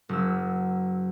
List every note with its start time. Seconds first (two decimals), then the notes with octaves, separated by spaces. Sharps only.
0.09 F#1 E6